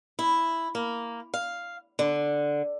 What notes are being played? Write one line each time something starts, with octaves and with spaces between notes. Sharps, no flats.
E4
A#3
F5
D3